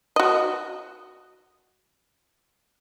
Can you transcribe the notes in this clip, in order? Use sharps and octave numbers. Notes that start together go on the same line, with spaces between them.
F#4 D#5